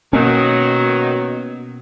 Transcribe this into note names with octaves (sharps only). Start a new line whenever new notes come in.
B2 D#3 F#3 A#3 C#4